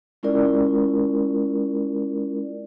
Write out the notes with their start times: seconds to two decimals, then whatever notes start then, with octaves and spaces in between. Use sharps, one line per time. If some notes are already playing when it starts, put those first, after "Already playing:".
0.23 G#3 C#4 E4 F4 A#4 D5